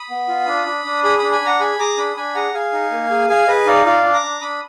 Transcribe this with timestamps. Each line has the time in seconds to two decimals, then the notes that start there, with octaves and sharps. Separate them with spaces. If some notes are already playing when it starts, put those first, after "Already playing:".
Already playing: B5 D#6
0.10 B3
0.28 F4
0.47 D4
0.66 D4
0.85 D4
1.04 G#4 B5 D#6
1.18 D4 B5 D#6
1.32 G#5 B5
1.42 D4 F#5 A#5
1.60 G#4 G#5 B5
1.79 G#4 A#5 D6
1.97 D4 B5 D#6
2.16 D4 G#5 B5
2.35 G#4 F#5 A#5
2.54 G#4 F5 G#5
2.73 D#4
2.92 A#3
3.11 G#4
3.29 G#4 F5 G#5
3.47 G#4 B4 D#5
3.66 D#4 D5 F5
3.85 F4 D5 F5
4.04 D4
4.13 A#5 D6
4.23 D4
4.41 D4 B5 D#6